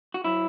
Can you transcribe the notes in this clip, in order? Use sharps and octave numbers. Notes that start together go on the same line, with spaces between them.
F#4
F#3 E4